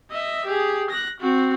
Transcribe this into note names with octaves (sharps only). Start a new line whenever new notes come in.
D#5 E5
G4 G#4
F#6 A#6
C4 F#4